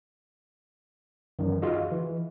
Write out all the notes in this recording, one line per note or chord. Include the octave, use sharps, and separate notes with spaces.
F#2 D#3 E3
F4 F#4 G#4 D#5
E3